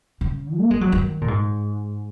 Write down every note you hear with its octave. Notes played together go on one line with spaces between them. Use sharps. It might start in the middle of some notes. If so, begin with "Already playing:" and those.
C#3
A#3
G#3
F#3
D#3
A#2
G#2